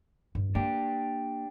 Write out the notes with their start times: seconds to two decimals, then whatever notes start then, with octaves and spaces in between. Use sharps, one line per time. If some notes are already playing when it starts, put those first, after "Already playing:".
0.35 G2
0.55 A#3 D4 G4